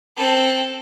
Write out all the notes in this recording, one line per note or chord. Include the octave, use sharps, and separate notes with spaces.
C4 A4